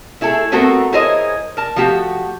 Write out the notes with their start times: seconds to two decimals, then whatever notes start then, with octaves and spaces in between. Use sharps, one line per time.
0.21 A3 E4 G#4 A4
0.52 A3 B3 C4 F#4 A4 A#4
0.93 E4 G#4 A#4 C5 C#5 D#5
1.57 A#4 A5
1.76 F3 A3 F#4 G4